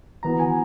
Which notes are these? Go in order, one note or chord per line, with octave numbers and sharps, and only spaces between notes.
E3 B3 F#4 A#5
G#5